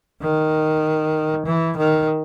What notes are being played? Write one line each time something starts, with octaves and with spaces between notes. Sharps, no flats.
D#3
E3
D#3